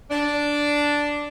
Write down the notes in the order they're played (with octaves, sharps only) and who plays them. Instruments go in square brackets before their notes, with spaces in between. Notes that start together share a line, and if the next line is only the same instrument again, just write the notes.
[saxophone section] D4